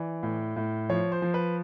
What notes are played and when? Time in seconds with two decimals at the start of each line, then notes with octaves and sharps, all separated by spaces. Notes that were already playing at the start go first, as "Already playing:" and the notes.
Already playing: E3 D5
0.23 A2
0.56 A2
0.89 F3 C#5
1.12 C5
1.22 F3
1.34 B4